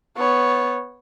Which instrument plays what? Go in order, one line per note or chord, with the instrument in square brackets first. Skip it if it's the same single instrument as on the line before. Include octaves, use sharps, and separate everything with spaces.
[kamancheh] B3 C#5